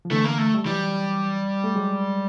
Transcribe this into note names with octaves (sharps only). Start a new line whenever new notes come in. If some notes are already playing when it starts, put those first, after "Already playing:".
F3
D3 E3 A3
A#3
A3
G3
E3 F#3 G3
A3
F#3 G#3